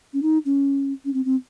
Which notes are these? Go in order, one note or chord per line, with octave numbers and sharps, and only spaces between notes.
C#4
D#4
C#4
C#4
C4
C4